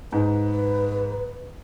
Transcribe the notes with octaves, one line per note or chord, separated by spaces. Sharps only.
G#2 B4